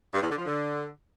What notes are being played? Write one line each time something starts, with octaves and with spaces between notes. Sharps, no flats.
G2
E2
D3
F3
D3